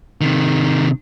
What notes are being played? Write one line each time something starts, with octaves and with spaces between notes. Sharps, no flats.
C3 D#3